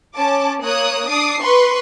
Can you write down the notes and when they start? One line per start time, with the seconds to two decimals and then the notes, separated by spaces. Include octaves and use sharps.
0.16 C#4 A5 D6
0.63 A#3 C#5 D#6 F#6
1.08 D4 D6 D#6 C7
1.41 B4 C6 C#6